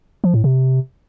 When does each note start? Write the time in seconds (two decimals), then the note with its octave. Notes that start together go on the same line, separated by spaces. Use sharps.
0.24 F3
0.34 A2
0.44 C3